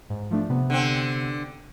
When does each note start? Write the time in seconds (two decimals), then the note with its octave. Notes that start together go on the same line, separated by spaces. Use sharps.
0.10 G#2
0.31 F3 A3 D4
0.49 C3 B3
0.70 D3 C4